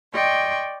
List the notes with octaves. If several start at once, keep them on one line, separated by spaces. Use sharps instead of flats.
D5 D#5 G5 C6 C#6